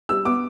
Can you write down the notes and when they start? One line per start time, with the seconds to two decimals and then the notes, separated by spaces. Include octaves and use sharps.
0.09 G3 E6
0.25 B3 D6